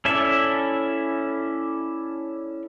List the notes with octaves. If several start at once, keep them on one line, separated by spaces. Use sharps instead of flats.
C#4 E4 A4 D5 E5